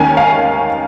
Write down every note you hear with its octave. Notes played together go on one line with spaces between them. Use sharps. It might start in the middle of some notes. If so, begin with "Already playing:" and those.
Already playing: D#2 D#3 C#4 G#5
F5